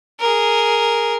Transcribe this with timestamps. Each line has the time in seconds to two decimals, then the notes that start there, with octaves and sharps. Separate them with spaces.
0.20 G#4 A#4